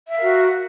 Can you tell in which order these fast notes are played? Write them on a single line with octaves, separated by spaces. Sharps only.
E5 F5 A#4 F#4